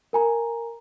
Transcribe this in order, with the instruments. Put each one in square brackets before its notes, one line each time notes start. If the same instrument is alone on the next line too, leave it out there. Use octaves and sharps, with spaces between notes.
[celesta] A#4 G#5 A#5